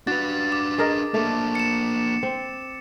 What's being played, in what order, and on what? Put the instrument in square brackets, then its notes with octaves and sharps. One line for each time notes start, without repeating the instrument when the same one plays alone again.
[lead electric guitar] D4 B4 [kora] F#4 [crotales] A6
[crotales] D6
[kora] G#4 A#4 D#5
[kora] A3 [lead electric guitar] A#3 D4
[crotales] C#7 E7
[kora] C4